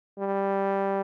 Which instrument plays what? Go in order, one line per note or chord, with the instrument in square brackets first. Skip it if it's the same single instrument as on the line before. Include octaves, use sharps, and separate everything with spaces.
[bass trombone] G3